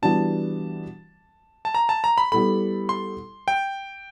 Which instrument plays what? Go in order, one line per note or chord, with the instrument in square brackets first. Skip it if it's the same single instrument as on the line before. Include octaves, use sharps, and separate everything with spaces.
[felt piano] E3 G3 B3 D4 F#4 [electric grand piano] A5
[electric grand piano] A5
A#5
A5
A#5
B5
[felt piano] G3 B3 E4 A4 [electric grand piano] B5
[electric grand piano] C6
G5